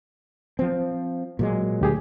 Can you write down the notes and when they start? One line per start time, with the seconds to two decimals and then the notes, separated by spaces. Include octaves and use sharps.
0.59 F3 C4
1.39 A#2 F#3 G#3
1.81 D2 G4 G#4